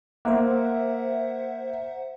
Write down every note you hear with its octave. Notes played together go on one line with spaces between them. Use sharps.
A#3 C5 E5 F#5